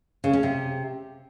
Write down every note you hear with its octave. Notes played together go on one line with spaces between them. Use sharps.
C#3
C#4
C3